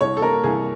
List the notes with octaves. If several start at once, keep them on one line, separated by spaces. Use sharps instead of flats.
C2 C#5
A4
A#3 A#4
C2 G#4